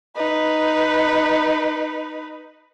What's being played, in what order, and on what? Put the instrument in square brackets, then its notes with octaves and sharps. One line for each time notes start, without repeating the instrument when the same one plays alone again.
[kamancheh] D#4 B4